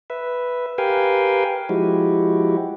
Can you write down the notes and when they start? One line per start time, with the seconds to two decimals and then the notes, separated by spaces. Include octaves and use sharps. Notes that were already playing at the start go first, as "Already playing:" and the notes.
0.10 B4 E5
0.78 G4 A#4 B4 F5 G5 G#5
1.69 F3 G#3 E4 F#4 G4